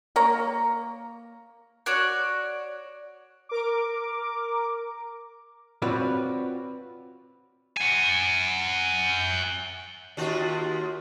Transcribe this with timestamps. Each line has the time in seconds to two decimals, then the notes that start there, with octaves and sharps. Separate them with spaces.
0.16 A#3 C#5 A#5
1.86 F#4 C#5 D5 F#6
3.49 A#4 D6
5.82 C4 F4 F#4 B4 C#5 D5
7.77 F#5 G#5
10.17 D#2 F4 F#4